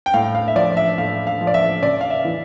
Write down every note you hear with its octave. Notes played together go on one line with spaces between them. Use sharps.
G5
A2 F5
F5
E5
F3 D5
E5
A2 F5
F5
F3
D5
E5
C#3 D5
F5
E5
E3